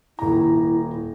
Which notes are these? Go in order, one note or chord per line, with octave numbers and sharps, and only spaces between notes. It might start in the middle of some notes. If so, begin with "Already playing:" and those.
D#1 E4 A#5